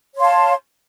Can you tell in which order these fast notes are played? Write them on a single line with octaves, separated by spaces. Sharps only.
C#5 C6 F5 A5